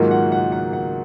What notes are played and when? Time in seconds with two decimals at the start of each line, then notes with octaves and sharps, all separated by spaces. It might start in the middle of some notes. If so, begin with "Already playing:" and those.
Already playing: G#2 D#3 F#3 A#3 F4 F#5
0.11 F#5
0.32 F#5
0.52 F#5
0.73 F#5